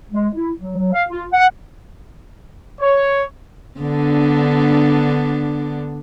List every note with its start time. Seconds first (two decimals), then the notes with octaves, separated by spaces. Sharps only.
0.12 G#3
0.34 E4
0.60 F#3
0.77 F#3
0.93 F5
1.09 F4
1.32 F#5
2.81 C#5
3.80 D3 B3 D4